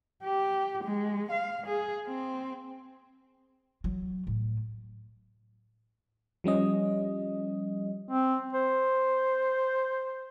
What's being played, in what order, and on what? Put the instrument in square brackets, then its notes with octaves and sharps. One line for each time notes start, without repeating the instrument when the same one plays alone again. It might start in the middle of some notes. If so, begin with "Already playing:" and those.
[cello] G4
G#3
F5
G#4
C4
[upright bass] F#3
A2
[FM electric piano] F3 G3 C#4 D#5
[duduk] C4
C5